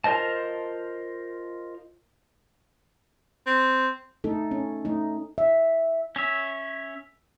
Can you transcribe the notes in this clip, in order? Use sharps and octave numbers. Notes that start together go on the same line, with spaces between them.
F4 A#4 C5 D#5 A5
C4
A3 D#4 A4
C#4
A3 D#4
E5
C#4 C#5 E5